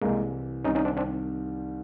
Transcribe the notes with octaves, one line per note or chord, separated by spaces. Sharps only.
C2 C3 E3 G#3 A#3
C2 C3 D#3 G3 C#4 D#4
C#4 D#4
C4 D4
C4 D4